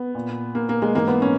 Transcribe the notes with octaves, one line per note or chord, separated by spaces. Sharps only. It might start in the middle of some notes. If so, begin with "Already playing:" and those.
Already playing: B3
A#2
A#3
A#3
G#3
G#2 E3 A#3
B3
C#4